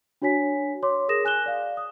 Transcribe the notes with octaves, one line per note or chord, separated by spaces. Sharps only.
D4 F#4 C#5 G#5 B6
C#5 C6 D6
G#4 A#4 D#6 A#6 E7
G#5 F#6 E7 G7
D5 F5
D#6